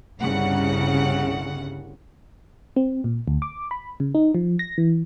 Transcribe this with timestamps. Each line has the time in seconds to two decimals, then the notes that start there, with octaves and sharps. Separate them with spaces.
0.20 G1 C2 G2 C#3 F#5
2.76 C4
3.04 A#2
3.28 D2
3.42 D6
3.71 B5
4.00 C#3
4.15 D#4
4.35 F3
4.59 A#6
4.78 E3